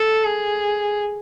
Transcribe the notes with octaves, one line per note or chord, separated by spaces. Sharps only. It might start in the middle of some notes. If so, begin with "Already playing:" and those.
Already playing: A4
G#4